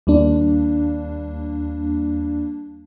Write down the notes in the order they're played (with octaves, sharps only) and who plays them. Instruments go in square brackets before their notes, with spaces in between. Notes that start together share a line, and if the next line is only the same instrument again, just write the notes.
[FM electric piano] D#2 G3 A#3 D4